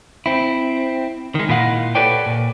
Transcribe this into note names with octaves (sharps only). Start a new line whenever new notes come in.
C4 E4
D#3 G#3
A#2 E4 F4 D#5 F5 F#5
G4 A4 B4 C#5 D5 G5
A#2